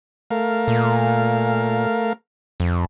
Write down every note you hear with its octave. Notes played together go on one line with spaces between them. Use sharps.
A3 A#4 F5
A#2
F2